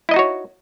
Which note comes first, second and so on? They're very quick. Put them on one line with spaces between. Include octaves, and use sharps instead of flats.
E4 D#5 D#4 F#4 C#5